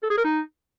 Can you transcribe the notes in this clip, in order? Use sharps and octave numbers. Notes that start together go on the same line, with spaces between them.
A4
G#4
A#4
D#4